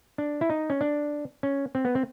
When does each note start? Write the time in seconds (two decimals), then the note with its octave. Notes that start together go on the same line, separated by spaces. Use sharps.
0.18 D4
0.41 E4
0.50 D#4
0.70 C#4
0.81 D4
1.43 C#4
1.75 C4
1.85 B3
1.95 C4